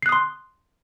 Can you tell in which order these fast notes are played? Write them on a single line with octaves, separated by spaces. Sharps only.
C7 F#6 D#6 C6